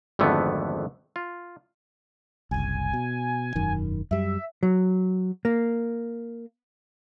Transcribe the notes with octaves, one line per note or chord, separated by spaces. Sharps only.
G#1 F2 D3 A3 B3
F4
F#1 C2 G#5
B2
E1 F#2 D#3
F#2 G3 E5
F#3
A#3